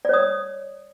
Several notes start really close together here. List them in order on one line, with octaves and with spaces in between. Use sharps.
D5 C#5 D#6